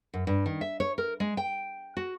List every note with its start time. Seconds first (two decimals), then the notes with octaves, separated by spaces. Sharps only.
0.14 F#2
0.27 G2
0.46 D#3
0.61 E5
0.80 C#5
0.98 A#4
1.20 G#3
1.37 G5
1.97 F#4